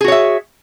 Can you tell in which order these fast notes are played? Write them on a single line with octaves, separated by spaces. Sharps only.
G#4 F#4 C#5 E5